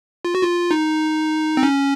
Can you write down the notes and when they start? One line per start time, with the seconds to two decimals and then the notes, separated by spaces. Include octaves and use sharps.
0.25 F4
0.35 F#4
0.43 F4
0.71 D#4
1.57 C4
1.63 C#4